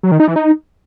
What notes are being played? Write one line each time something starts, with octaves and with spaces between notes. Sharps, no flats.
F#3
D#3
D#4
E3
D#4